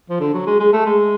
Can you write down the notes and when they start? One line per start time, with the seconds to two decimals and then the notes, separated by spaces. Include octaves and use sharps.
0.10 F3
0.20 D3
0.33 F#3
0.47 G#3
0.60 G#3
0.73 A3
0.86 G#3